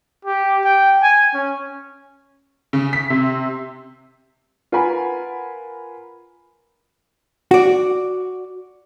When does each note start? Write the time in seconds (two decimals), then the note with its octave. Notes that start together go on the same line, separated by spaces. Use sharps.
0.25 G4
0.64 G5
1.03 G#5
1.34 C#4
2.73 C#3
2.93 B6
3.10 C3
4.72 F4 A#4 B4 F#5 G#5 B5
7.51 F#4 D5